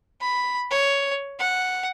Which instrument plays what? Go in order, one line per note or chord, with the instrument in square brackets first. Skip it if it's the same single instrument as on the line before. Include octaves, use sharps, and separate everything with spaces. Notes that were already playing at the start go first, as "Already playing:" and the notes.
[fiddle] B5
C#5
F#5